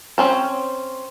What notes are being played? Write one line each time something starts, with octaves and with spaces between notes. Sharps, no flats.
C4 C#4 C5